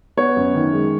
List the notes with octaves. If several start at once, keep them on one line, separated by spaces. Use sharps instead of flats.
B3 C#5
F#2
D#3
G#3